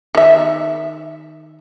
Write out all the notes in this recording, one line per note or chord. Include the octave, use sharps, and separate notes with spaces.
D#3 E5